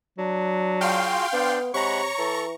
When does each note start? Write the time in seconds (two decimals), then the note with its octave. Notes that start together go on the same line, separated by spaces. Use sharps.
0.18 F#3 D4
0.81 F4 F#4 G#4 F5 G5 C6
1.33 B3 D4 C5
1.74 C3 G#3 C#5 F#5 A#5 B5 C#6
2.18 E3 A4